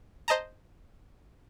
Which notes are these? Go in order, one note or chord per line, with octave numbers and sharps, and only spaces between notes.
C5 D#5 A5 A#5